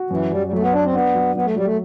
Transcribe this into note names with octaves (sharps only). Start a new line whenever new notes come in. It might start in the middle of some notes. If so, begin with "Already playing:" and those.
Already playing: F#4
F#2 E3
F#2 G3
G3
F#3 A3
B3
D4 D5
C4
B3 D4
F#3
F#3 B3
A3
F#3 G3
A3